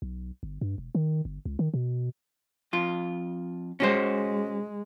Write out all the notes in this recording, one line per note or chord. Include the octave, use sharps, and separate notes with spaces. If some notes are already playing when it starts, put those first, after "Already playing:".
B1
G1
G2
E1
D#3
G1
C#2
D#3
B2
F2 F4
G#3 C#4 F#4 C5